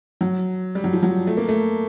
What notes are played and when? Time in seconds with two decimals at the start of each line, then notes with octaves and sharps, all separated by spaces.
0.21 F#3
0.75 G3
0.84 F#3
0.93 F3
1.03 F#3
1.27 A3
1.37 A#3
1.49 A3